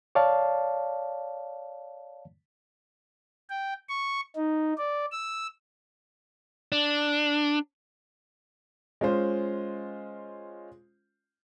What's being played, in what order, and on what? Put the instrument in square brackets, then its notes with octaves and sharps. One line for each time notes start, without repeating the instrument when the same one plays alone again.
[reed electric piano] C#5 D5 F5 A5
[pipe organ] G5
C#6
D#4
D5
E6
[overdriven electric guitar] D4
[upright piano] G#3 C#4 F4 C5